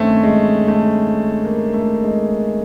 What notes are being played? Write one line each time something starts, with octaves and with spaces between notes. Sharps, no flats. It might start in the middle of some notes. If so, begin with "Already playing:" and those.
Already playing: G2 D#3 A3 C4 C#4
G#3
A3
A#3
A3
G#3